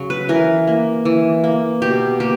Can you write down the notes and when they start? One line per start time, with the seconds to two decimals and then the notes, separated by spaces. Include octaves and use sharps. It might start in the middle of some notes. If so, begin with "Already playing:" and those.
Already playing: C#3 F#3
0.10 B4
0.29 E3 A#4
0.67 A#3
1.05 E3
1.44 A#3
1.82 B2 G4
2.20 A#3 G4